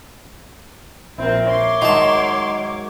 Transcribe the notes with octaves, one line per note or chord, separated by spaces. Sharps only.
A#1 C4 E4 A#4
C#5 C6 D6
G#2 D#3 F#3 D#4 A5